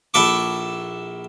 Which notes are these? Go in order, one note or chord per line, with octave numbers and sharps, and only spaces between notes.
A#1 E4 A4 E5 C#6 D6